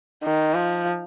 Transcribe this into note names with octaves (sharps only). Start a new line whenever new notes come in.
D#3
F3